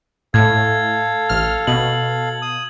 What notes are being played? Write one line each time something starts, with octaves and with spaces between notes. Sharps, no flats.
A2 A4 F5 G#6
A1 F6
B2 F#7
D#6